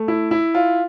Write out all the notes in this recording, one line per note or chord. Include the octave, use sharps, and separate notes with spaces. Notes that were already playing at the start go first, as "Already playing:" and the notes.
Already playing: A3
E4
E4
F4